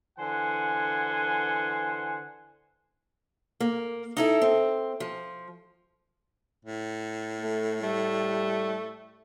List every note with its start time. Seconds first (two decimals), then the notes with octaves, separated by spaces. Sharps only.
0.19 D3 E3 C5 F#5 G#5
3.60 A#3
4.17 D#4 E4 A4
4.42 C4
5.00 F3
6.65 A2
7.41 A3
7.83 G3 A3